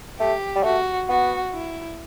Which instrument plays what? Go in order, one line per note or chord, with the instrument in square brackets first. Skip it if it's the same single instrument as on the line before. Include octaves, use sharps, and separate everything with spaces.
[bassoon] A3 [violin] G4
[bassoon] G3
[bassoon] A3 [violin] F#4
[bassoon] B3 [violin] F#4
[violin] E4